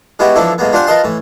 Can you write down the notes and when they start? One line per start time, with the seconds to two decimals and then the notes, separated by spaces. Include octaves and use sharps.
0.19 G#3 B3 E4 F#4 G4
0.36 E3 F3 A#3 D4 E4 A4
0.58 A2 G#3 A#3 B3
0.72 D4 F4 G4 C5 F#5 G#5
0.87 F4 A#4 B4 D#5 A5 C6
1.04 A2 E3